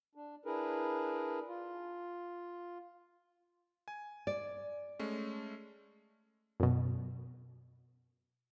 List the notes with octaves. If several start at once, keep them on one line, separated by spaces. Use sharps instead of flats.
D4
D4 E4 G#4 A#4 B4
F4
G#5
D5
G#3 A3 C#4
F#2 B2